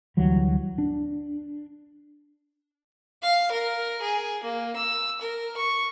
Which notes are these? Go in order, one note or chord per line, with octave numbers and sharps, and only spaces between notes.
D2 E3 F#3 G3
D4
F5
A#4
G#4
A#3
E6
A#4
C#6